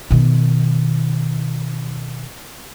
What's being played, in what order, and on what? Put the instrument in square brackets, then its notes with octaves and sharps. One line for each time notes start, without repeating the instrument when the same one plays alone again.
[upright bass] B2 D#3